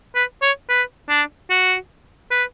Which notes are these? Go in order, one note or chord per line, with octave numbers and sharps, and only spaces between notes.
B4
C#5
B4
D4
F#4
B4